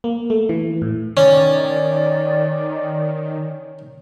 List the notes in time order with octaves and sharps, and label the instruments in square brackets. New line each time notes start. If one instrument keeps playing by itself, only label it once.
[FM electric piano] A#3
A3
E3
A2
[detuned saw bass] D#3 [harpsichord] C#4 [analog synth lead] D5